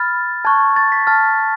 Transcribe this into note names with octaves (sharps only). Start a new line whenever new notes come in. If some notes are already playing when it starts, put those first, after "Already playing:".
Already playing: B5 F6 A6
A5 C#6 F#6 G#6
A6
B6
A5 F6 A6